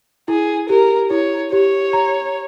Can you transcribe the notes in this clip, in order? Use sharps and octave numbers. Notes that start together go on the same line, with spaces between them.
E4 G#4
G4 A#4
E4 C#5
G4 C#5
A#5